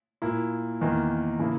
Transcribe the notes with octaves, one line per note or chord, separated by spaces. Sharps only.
A#2 A#3 E4
E2 D#3 A#3
C#3 E3 A#3 E4